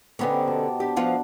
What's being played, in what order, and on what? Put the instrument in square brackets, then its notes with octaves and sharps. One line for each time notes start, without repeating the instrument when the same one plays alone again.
[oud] D3 B3 C#4 [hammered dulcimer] D#4 G4 C5
[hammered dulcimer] B2 A5 D6
[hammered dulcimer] D4 [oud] G4
[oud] F3 B3 F4 [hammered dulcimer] F#5